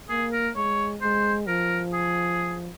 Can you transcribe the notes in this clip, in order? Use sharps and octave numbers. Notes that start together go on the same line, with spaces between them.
A#3 G#4
A#4
G#3 C#5
G#3 C5
F3 A#4
G#4